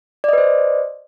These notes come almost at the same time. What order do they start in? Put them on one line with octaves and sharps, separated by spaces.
D5 D#5 B4 C5